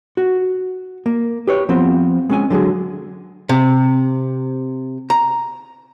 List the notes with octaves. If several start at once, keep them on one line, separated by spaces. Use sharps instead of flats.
F#4
A#3
G4 B4 C#5
F3 B3 C4
G#3 C#4 G#5
D3 F#3 G#3 G#4
C3
A#5